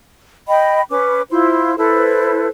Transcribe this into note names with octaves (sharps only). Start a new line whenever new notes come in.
D#5 G5 B5
C#4 B4 D6
E4 F4 C5 C6
E4 A4 B4 C5